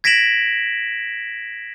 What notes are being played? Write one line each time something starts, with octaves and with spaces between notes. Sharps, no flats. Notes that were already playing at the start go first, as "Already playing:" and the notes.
G#6 A#6 B6 D7 E7 F#7